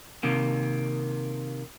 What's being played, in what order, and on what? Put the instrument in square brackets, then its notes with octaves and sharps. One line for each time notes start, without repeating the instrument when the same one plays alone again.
[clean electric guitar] C3 D#3 A#3